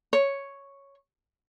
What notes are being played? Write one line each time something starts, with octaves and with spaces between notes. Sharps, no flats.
C#5